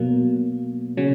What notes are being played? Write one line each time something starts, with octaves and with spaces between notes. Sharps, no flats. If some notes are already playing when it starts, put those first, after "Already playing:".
Already playing: B2 F#3 A#3
C#3 F#3 C#4